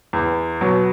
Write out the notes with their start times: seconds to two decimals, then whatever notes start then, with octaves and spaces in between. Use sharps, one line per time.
0.13 E2
0.61 B2 F#3